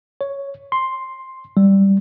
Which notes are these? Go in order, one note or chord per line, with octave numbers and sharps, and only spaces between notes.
C#5
C6
G3